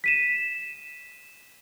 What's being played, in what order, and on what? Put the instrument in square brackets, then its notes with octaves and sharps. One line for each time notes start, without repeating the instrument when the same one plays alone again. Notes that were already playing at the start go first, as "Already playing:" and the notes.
[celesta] B6 D#7 E7